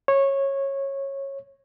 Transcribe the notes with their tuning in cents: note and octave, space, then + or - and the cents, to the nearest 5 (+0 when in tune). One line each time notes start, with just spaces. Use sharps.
C#5 -15